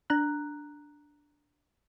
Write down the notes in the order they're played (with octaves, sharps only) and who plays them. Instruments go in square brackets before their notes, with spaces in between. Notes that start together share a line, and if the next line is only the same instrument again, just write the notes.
[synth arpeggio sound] D4 A#5 F#6